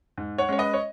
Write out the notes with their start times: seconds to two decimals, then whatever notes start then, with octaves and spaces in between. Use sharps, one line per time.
0.18 G#2
0.38 C#5 F#5
0.49 G#3 C#4 C#5
0.58 B4 D#5
0.73 C#5